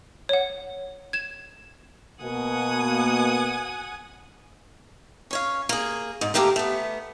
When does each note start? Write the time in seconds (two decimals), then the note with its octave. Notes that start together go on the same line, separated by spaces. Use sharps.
0.29 C#5 F#5
1.13 G#6 E7
2.22 B2 A#3 F#5 G#5 D#6
5.31 C#4 C#5 F5
5.69 A#3 G#4
6.21 G#2
6.34 D2 A3 A#3 G4 A#4
6.56 A3 B3